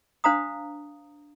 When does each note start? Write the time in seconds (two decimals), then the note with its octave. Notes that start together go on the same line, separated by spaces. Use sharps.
0.24 D4 C5 F5 A#5 D#6